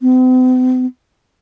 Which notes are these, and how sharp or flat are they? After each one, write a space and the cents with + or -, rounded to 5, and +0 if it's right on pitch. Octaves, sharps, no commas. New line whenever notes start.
C4 -45